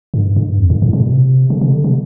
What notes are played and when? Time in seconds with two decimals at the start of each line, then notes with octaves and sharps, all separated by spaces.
0.14 G2
0.36 G2
0.59 F2
0.70 G2
0.82 A2
0.93 C3
1.01 A#2
1.09 C3
1.50 C3
1.61 C3
1.73 D3
1.84 C3